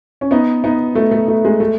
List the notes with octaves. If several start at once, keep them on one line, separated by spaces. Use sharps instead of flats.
C#4
B3 D#4
B3 D#4
A3
A3
A3
G#3
A3